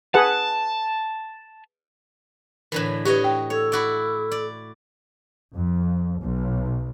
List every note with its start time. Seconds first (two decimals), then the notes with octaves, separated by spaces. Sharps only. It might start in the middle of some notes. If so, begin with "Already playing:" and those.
0.14 G#4 B4 F#5 A5
2.72 A2 D3 E3 A#4 B4
3.05 F#4 G4 B4 C#5 D#5
3.24 G5
3.50 A4 C#5
3.72 E4 F#4 D5
4.32 D5
5.54 F2
6.21 B1